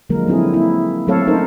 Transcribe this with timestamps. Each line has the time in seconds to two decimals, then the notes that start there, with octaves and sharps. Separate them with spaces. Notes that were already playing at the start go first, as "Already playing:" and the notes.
0.10 D3 F3 F#3 G#3 A#3 A#4
0.27 F#3 C4 E4 G#4
0.54 A#3 E4
1.07 F#3 A3 C4 A4 C#5 F5
1.27 C#4 D#4 A4 A#4 C5